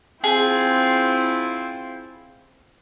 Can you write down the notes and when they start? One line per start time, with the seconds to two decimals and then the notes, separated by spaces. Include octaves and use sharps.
0.24 C4 E4 F4 G#4